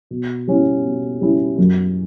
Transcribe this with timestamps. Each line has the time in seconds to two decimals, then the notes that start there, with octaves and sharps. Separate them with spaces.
0.11 B2
0.48 G3 C#4 E4
0.85 B2
1.21 G3 C#4 E4
1.58 F#2